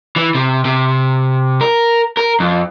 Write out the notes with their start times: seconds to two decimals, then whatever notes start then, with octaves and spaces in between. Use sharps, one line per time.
0.16 E3
0.35 C3
0.65 C3
1.61 A#4
2.17 A#4
2.40 F2